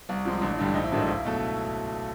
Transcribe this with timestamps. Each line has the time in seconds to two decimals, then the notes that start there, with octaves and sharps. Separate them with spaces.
0.09 C2
0.25 C3 F3 G#3
0.41 A1 D4
0.59 G2 D3 G3
0.75 A#1 D#4
0.83 E4
0.91 G#2 D#3 F#3 A3 D4
1.00 D#4
1.07 C#2 E4
1.24 B2 F#3 A3